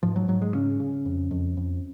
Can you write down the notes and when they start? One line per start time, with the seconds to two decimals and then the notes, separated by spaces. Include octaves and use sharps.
0.03 G#2 F3
0.16 F#3
0.28 G#2 F#3
0.42 G#3
0.54 C#3 C#4
0.80 C#3
1.05 F2
1.31 F2
1.57 F2